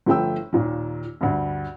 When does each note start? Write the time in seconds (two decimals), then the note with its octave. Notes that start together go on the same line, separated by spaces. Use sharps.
0.06 G1 F3 A3 G5 E6
0.53 D#2 A#2 D#3
1.21 D2 G2